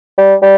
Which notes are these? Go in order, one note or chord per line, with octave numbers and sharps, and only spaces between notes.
G3
G3